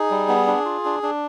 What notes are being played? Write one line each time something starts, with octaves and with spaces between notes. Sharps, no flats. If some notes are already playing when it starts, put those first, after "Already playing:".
Already playing: D#4 G#4
G3
B3
D4
F4
D4
D4